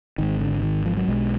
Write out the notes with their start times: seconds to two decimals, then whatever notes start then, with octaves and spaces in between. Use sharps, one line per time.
0.18 G#1 G#2 D#3
0.40 D3
0.63 D#3
0.86 F3
0.97 F#3
1.08 B1 B2 G#3